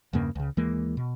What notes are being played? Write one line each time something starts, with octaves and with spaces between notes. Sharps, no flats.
E2 G2 C#3 A#3
C#2 C#3
D#2 E3 G#3 A#3
B2